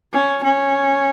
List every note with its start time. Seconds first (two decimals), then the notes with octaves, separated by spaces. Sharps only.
0.13 C#4
0.43 C#4